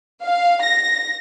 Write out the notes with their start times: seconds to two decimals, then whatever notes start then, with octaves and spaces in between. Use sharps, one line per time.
0.23 F5
0.63 A#6